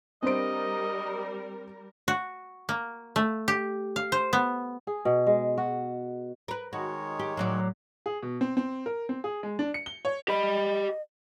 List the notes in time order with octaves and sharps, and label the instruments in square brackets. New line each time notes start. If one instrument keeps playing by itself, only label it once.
[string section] G3 A#4 [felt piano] C4 D7 [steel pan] D4 C5 [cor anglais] D#5
[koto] F#4
A#3
A3
G4
F5
C5
B3
[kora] G#4
B2
G#3
F#4
[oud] A#4 B4
[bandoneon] D#3 G#3 C#5 [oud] F#4
[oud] G4
A2 F#3 D5
[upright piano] G#4
B2
C4
C4
A#4
C4
G#4
G#3
D4
C#7
G7
C#5
[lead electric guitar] G4 B5 [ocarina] D#5